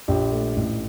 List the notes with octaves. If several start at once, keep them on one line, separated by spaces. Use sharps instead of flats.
A#1 G4
A3
A1